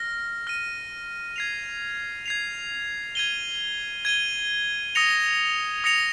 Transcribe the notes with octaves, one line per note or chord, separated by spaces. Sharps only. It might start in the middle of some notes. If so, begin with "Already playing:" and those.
Already playing: F6 A#6
F6 A#6 D#7
G#6 C7 F7
G#6 C7 F7
G#6 D#7 G7
G#6 D#7 G7
D#6 A#6 C#7 F7
D#6 A#6 C#7 F7